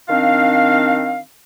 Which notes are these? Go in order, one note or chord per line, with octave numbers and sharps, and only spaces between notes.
D#3 C4 D4 F5